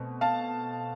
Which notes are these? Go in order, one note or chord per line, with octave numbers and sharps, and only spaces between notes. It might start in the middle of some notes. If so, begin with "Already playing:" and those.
Already playing: B2 A3 C4
F5 A5